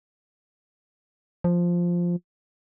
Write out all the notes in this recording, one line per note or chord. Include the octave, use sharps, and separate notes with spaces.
F3